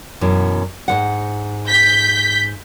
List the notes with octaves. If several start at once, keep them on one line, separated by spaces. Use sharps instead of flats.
F#2 B2 E3
G#2 F3 F#5
G6 B6